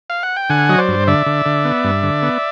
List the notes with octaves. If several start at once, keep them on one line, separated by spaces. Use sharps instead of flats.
F5
F#5
G5
D3 F#5 G#5
F#3 D#5
C5 D5
G2
D3 D5 E5
D3
D3
B3
G2
D3
B3